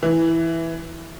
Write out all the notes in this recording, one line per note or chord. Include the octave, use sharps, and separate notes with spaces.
E3